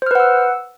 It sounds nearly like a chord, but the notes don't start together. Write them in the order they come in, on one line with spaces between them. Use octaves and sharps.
C5 F6 B4 F#5 E6